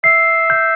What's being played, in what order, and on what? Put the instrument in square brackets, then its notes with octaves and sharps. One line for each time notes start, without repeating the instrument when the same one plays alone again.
[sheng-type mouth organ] E5 [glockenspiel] C7
[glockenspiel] G6